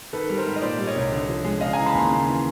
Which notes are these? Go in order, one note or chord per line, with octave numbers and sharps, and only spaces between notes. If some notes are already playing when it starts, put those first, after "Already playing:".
D#3 A4 B4
G3
A#4 C5
G#2
D#5
A#2 C5 D5
G3
C#5 D#5
C2
D3
F3
G#3
C#3 D#5 F5
E3 G#5 A#5
A5 B5
D#2 A#5 C6
C#3
E3